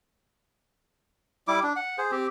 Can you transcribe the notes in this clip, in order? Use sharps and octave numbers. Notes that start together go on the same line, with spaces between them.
G3 E4 D6
D4
F#5
G#4 C5
C4 G4